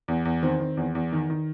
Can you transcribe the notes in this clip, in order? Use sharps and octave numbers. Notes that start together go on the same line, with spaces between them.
E2
E2
D#3 C4
D#3
E2
E2
D#3
D#3